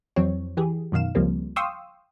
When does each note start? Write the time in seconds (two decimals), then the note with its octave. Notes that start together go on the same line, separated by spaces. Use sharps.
0.16 F2 E3 F#3 C4 C#5
0.57 E3 G4 G#4
0.92 F#2 B2 D#3 F5 E7
1.15 C#2 F3 G3 A#3 C4
1.56 F5 G5 C6 C#6 D#6 E6